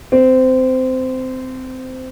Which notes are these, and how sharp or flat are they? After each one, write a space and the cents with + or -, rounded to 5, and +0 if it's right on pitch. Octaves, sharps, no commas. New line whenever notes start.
C4 -20